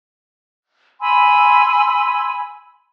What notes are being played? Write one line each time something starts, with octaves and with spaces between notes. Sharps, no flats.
G#5 B5 C6 E6